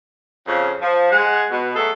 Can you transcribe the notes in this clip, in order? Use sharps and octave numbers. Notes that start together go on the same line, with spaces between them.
F2 C#3
F3
G#3 F#5
B2
F#3 A3 G#4 A4